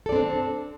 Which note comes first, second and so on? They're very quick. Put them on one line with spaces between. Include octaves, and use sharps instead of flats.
A4 D5 C4 D4